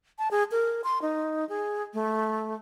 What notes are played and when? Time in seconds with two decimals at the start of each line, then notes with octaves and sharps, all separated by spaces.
0.19 A5
0.31 G#4
0.51 A#4
0.84 C6
1.02 D#4
1.49 G#4
1.94 A3